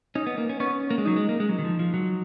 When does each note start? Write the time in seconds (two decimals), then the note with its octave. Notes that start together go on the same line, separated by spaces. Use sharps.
0.15 C#4 D#4
0.27 B3
0.38 A#3
0.49 C#4
0.60 B3 C#4
0.91 A#3
0.98 G#3
1.05 F#3 D#4
1.16 G#3
1.29 A#3
1.40 G#3
1.49 F#3
1.59 D#3
1.65 F3
1.79 F3
1.94 F#3